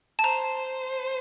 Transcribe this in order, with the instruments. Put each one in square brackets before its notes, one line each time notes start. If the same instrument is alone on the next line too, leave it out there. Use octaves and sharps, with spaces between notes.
[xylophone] A5
[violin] C5 [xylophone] A#5